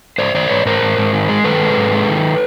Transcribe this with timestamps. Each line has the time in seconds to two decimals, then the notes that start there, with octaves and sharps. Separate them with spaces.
0.18 G#2 C5 D5
0.35 D#3 C5 D5
0.49 G#2 B4 C#5
0.65 G#2 A#4 C5
0.82 G#2
0.98 G#2
1.13 D#3
1.29 G#3
1.44 D#3 A4 B4
1.62 G#3
1.77 G#2
1.93 G#3
2.09 D#3